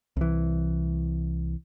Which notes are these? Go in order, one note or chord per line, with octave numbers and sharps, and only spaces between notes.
C2 E3